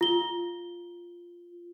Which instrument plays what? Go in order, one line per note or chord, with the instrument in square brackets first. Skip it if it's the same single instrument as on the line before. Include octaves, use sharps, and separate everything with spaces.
[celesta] F4 G7